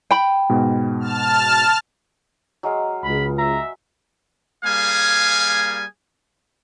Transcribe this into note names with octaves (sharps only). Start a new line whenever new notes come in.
G5 B5
G#2 B2
A5 F6
F#3 G#3 F5
C#2 B5
E5 A#5
G3 A#3 G#4 F5 G#5